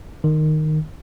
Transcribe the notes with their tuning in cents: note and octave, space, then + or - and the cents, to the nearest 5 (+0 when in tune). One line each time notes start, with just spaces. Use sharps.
D#3 -10